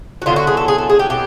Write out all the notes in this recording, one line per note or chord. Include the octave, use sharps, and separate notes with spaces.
F#4
D3 F#3 B3 E4 F4
F#4
G#4
A4
G#4
A4
G#4
G4
B2 F#3 G4